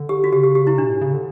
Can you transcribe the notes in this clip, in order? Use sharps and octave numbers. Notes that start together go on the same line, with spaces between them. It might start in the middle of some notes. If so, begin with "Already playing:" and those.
Already playing: D3
G4
F#4
C#3 G4
G4
G4
E4
B2 D4
A2
C#3
D3